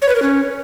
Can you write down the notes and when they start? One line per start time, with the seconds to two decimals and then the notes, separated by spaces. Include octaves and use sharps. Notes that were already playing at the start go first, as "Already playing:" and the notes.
0.02 C#5
0.09 B4
0.15 A#4
0.22 C#4